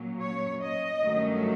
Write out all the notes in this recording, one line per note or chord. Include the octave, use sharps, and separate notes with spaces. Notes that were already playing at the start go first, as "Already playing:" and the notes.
Already playing: A#2 F#3 A#3 C#4
C#5
D#5
G2 D#3 F#3 A3 C#4